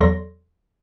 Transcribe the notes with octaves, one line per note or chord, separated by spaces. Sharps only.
E2 F#3 A4 D5 C6 A#6